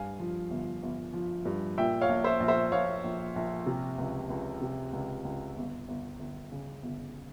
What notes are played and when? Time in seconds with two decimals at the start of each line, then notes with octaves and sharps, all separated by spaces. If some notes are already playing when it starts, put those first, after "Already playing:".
Already playing: G2 F5 G#5
0.19 F3
0.50 G1
0.83 G1
1.13 F3
1.45 G2
1.78 A#2 E5 G5
2.01 C#5 F5
2.09 A#1
2.24 C5 E5
2.40 A#1
2.48 C5 E5
2.72 A#1 C#5 F5
3.04 A#1
3.36 A#1
3.66 C3
3.98 C#2
4.30 C#2
4.61 C3
4.93 C#2
5.25 C#2
5.56 G1
5.88 G1
6.19 G1
6.52 C#3
6.83 G1